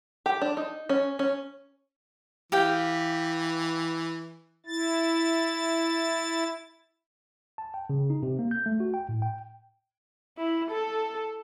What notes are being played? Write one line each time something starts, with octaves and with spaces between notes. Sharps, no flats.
G4
D4
D#4
C#4
C#4
E3 G4 F5 G5
E4 A6
A5
G5
C#3
D#4
C3
A#3
G6
A3
F#4
G5
A2
G5
E4
A4